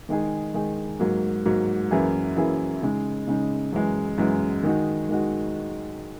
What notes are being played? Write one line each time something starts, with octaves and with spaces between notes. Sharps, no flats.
D#3 G#3 D#4 G#4
D#3 G#3 D#4 G#4
G#2 F#3 A#3
G#2 F#3 A#3
F#2 E3 A#3 E4 G#4
F#2 E3 A#3 E4 G#4
C#3 G#3 D#4
C#3 G#3 D#4
F#2 E3 G#3
F#2 E3 G#3
D#3 G#3 D#4 F#4
D#3 G#3 D#4 F#4